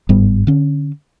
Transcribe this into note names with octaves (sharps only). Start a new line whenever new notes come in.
G1 G#2 G3 B3
D3 C#4